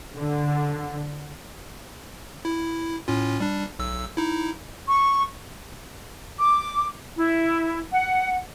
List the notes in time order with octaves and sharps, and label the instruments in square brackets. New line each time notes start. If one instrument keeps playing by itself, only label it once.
[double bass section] D3
[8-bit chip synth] E4
A2 C#4 F4
G3 D4
B1 E6
D#4 E4
[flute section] C#6
D6
E4
F#5